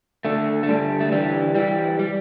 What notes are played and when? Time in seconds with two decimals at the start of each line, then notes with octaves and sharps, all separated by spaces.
0.25 D3 A3
0.63 A3
0.69 D3 G3
1.01 A3
1.12 E3 G3
1.55 E3 G3
1.99 G3